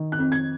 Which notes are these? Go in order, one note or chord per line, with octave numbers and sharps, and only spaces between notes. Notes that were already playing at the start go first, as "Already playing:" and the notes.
Already playing: D#3
F#6
F2
G#6